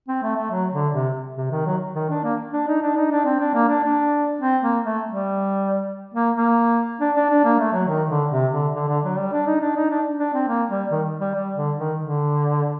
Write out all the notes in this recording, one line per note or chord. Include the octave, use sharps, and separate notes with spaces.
C4
A3
A3
F#3
D3
C3
C3
D#3
F#3
D#3
D4
A#3
D4
D#4
D4
D#4
D4
C4
D4
A#3
D4
D4
C4
A#3
A3
G3
A#3
A#3
D4
D4
D4
A#3
A3
F#3
D#3
D3
C3
D3
D3
D3
F#3
G3
D4
D#4
D4
D#4
D4
D4
C4
A#3
G3
D#3
G3
G3
D3
D#3
D3